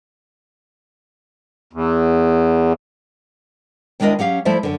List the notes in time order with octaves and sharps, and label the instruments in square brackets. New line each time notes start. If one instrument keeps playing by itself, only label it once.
[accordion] E2
[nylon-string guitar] D#2 G#3 D4 E4 A#4 D#5
F#3 C#4 G4 F5
F3 A3 E4 C5 D5 E5
F#2 D3